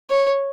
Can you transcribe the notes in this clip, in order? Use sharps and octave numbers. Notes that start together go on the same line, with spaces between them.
C#5